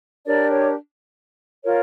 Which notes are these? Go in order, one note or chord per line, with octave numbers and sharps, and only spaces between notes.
D4 G4 A#4 C#5 D5
C#5
F4 A#4 C#5